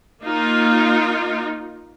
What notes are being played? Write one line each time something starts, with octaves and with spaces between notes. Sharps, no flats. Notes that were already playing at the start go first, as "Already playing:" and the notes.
A#3 D#4 F4